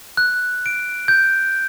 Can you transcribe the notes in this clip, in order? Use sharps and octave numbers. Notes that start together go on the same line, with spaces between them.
F#6
D7
G6